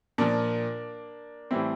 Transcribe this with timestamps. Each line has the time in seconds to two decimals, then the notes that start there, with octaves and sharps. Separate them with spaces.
0.18 A#2 F3 A#3 D4
1.51 A2 E3 G3 C4 E4